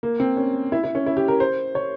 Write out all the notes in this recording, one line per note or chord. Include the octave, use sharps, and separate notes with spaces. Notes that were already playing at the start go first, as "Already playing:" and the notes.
A#3
C4
C#4
E4
E4
C#4
E4
G4
A#4
C5
C#5